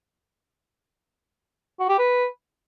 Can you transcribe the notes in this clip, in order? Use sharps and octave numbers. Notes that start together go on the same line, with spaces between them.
F#4
G4
B4